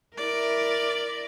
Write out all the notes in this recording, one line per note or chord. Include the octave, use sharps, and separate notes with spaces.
E4 A#4 D5